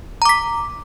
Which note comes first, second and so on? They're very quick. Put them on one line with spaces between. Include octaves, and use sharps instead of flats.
A#5 D6 B6